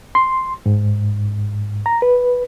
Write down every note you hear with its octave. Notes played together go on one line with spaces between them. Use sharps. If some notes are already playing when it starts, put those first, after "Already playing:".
C6
G#2
A#5
B4